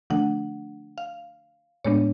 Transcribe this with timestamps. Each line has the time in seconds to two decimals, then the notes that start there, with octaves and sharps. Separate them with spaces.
0.10 D3 F3 A3 D4 F#5
0.98 F5
1.84 A2 G#3 B3 D4 C#5